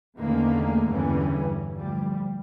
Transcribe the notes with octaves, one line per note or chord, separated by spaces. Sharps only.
E2 D3 D#3 A3 A#3 C#4
E2 G2 D3 E3 G3 C#4
D2 F3 G3